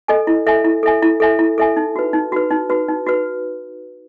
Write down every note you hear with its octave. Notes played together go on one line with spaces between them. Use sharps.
A4 D#5 G#5
E4
A4 E5 G#5
E4
A4 E5 G#5
E4
A4 E5 G#5
E4
A4 E5 G#5
D#4
F#4 B4
D#4
F#4 B4
D#4
F#4 B4
D#4
F#4 B4